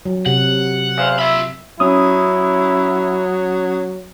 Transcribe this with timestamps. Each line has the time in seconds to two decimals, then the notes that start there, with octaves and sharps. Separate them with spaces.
0.06 F#3
0.26 C3 F#5
0.98 E2 C5 F5
1.19 F4 E5 B5
1.80 F#3 C#4 E4 D#6